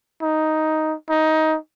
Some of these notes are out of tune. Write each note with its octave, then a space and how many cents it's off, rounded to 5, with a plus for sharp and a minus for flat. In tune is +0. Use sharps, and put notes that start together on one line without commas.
D#4 +5
D#4 +15